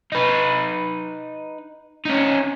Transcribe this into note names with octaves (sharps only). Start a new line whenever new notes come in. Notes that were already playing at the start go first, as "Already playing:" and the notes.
D#4 B4
C#4 D#4